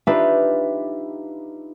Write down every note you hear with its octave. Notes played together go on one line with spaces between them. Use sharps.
D4 D#4 F4 G4 B4 E5